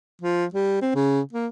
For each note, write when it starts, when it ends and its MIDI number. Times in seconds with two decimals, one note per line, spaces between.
0.22 0.45 53
0.54 0.79 55
0.82 0.92 60
0.95 1.20 49
1.33 1.47 58